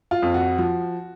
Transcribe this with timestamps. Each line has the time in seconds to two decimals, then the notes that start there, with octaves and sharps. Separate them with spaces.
0.11 F4
0.23 F2
0.34 F#4
0.58 F3